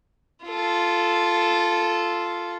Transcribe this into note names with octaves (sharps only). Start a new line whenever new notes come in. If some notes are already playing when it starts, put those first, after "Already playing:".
F4 A4